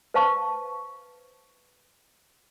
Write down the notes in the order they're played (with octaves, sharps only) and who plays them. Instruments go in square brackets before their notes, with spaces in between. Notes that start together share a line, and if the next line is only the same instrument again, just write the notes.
[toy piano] B4 C5 F5 A5 C#6